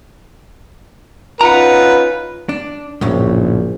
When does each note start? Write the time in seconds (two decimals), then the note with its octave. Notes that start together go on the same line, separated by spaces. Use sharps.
1.41 C#4 D#4 F4 B4 F#5 A#5
2.49 D4
3.01 A#1 F#2 A2 C#3